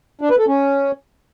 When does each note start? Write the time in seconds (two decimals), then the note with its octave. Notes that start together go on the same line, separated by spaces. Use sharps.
0.21 D4
0.30 B4
0.39 A4
0.48 C#4